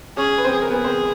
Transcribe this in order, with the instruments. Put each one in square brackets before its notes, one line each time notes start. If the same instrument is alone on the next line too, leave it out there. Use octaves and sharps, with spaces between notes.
[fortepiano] C#4 C#5 [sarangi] G#4
[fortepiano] B4
C4 C5
A#4
[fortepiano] B3 B4 [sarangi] G#4
[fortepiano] C4 C5